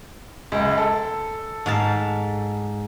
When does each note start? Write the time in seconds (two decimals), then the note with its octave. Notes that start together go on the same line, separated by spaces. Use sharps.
0.52 C#2 F#2
0.78 A4
1.66 G#2 F5 A5